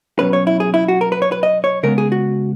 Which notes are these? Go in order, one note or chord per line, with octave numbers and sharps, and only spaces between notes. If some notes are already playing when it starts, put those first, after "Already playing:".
B2 F#3 C#4 B4
C#5
E4
G#4
E4
F#4
A#4
B4
C#5
B4
D#5
C#5
C#3 G#3 B3 A#4
G#4
F#4